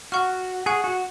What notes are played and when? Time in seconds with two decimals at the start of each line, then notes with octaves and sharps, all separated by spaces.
0.12 F#4 F#5 C#6 F6
0.66 G#4 F#5 C#6 F#6
0.84 F#4